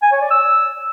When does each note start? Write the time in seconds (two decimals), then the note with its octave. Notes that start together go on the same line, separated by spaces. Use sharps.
0.03 G#5
0.12 C#5
0.21 D5
0.31 E6